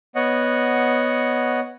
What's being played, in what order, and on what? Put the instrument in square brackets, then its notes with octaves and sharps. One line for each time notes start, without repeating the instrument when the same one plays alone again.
[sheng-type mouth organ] B3 C#5 D#5 F#5